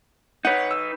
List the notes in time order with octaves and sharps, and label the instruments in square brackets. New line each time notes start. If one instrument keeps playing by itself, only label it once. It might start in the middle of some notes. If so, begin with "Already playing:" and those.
[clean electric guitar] D#4 B4 [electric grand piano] C#5 F#5
[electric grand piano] E6